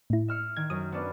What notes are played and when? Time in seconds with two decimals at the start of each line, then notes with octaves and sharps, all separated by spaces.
0.10 A2 E4
0.28 E5 F6 C#7
0.57 D#3 G#6
0.70 F#2 D#6
0.92 B3 C#4 D4